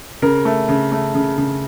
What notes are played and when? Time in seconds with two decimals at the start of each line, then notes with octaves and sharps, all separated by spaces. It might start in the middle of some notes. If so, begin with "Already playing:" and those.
0.22 C#3 A#4
0.45 A3
0.69 C#3
0.92 A3
1.15 C#3
1.38 C#3